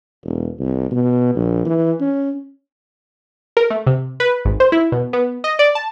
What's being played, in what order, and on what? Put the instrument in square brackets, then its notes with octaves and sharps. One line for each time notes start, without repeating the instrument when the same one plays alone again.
[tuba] E1
C2
B2
A#1
E3
C#4
[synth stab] A#4
A3
C3
B4
G#1
C5
E4
B2
B3
D#5
D5
A5